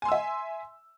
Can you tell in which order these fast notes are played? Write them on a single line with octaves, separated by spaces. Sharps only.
G#5 C6 E6 E5